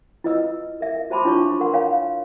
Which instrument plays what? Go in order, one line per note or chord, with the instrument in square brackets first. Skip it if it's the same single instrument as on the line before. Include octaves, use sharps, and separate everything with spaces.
[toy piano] E4 F4 B4 D#5 E6
A#4 E5
F#4 C5 A5 B5 C6 D6
D4 E4 F4 C#5 A5 C#6
A#4 B4 F#5 C6
C#5 F5 G#5 A#5